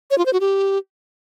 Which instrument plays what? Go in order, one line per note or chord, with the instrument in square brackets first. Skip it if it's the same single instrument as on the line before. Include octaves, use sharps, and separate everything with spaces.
[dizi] C#5
F4
C5
F#4
G4